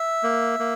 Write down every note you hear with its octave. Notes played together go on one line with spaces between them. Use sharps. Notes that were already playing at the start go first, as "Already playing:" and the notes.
Already playing: E5
A#3
A#3